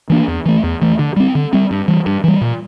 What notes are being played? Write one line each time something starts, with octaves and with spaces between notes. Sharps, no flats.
E3 A#3 D4
E2
E3 A3
E2
E3 A3
D3
G3 C4
D3
G3 C4
G2
E3 G3
G2
E3 G3
A#2